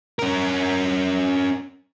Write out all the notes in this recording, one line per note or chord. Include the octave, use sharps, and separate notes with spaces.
C#4 A#4